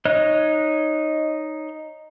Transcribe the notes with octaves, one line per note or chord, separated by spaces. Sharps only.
D#4 C#5 D#5 F#6